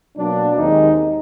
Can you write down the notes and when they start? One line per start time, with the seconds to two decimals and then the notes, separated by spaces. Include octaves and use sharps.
0.18 B2 F#3 A#3 D4
0.57 D#2 D#3 G#3 C4 D#4